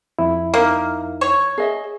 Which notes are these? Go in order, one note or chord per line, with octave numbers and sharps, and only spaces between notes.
F2 E4
A#3 D#4 A#4
C#5
G#4 D#5 E5